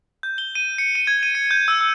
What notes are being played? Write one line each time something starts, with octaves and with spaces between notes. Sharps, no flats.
G6
G7
D#7
C#7
D#7
G#6
D#7
C#7
G6
E6
E6